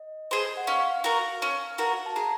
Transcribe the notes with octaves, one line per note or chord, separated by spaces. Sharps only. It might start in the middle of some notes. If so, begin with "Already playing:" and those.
Already playing: D#5
G#4 C5
F#5
C#4 F5
F#4 A#4
C#4
F#4 A#4
A5
G#4 A#5